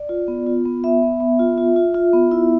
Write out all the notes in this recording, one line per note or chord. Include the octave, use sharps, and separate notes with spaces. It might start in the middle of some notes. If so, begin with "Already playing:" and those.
Already playing: D5
F4
B3
F4
B3
B3 E5
B3
B3
F4
F4
F4
F4
B3
E4